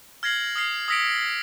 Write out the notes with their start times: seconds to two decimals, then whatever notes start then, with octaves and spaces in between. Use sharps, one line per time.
0.23 F6 G#6 A#6 C7 F#7
0.56 D#6 F6 C7
0.88 D#6 E6 A#6 B6 C#7 D7